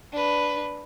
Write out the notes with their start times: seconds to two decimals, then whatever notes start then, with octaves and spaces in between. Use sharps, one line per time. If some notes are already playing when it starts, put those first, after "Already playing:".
0.12 D4 B4